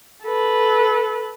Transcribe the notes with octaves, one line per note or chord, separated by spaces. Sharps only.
A4 B4